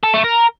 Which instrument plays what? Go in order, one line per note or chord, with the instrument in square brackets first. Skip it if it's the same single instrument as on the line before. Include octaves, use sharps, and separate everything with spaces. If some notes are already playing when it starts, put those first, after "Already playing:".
[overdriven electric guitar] A4
A3
A#4